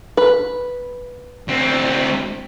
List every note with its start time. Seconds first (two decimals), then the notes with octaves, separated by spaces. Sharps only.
0.17 B4
1.48 D2 C4